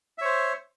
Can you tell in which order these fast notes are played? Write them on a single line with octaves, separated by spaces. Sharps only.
E5 C#5 C5